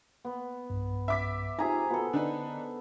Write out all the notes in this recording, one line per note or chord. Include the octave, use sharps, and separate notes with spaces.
B3
B1 G2
E5 D6 B6
C3 D#4 F4 G#4 A#5
B3 F4 F#4 A4 C5
D3 D4 D#4 B4